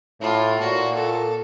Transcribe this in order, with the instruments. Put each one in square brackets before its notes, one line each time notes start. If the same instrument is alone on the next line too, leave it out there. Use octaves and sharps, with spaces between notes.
[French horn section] A2 [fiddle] F4
[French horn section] A#2 [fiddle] F#4
[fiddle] A4